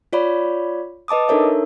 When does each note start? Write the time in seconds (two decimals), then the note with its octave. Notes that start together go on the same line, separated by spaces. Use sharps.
0.13 F4 C#5 D5 B5
1.08 B4 D#5 A5 D6 D#6
1.28 D4 D#4 A4 A#4 C#5 E5